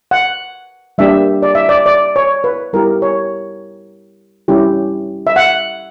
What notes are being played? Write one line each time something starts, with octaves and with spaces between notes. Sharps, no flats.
F#5
G3 A#3 D4 G4 E5
D5
E5
D5
D5
C#5
B4
G3 B3 E4 G4 A#4
C#5
G3 C#4 E4 G4
E5
F#5